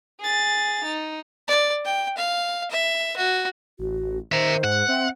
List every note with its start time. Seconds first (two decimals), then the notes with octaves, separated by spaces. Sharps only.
0.20 G#4 A6
0.85 D#4
1.48 D5
1.85 G5
2.17 F5
2.71 E5
3.17 F#4
3.79 A1 F#4
4.32 D#3 C5 E5 A#5
4.64 G#2 F#5
4.88 C4 E5